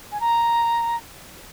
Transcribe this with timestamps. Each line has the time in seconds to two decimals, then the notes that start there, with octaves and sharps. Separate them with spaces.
0.11 G#5
0.20 A#5